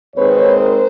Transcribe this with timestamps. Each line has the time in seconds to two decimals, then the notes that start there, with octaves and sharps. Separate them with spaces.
0.15 D#2 D#3 G#3 C4 B4 C#5
0.57 A#4 C5